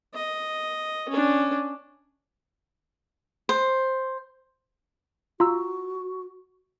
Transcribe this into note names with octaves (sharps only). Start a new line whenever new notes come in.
D#5
C#4 D4
C5
F4 F#4 A#5 E6